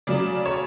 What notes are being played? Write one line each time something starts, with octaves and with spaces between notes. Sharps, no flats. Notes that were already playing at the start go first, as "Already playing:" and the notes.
C#3 F#3 D5
C#5